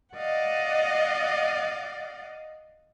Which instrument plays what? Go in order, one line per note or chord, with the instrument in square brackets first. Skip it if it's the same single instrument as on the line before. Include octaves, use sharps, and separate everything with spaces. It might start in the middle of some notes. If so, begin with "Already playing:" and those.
[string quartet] D5 D#5 F5 F#5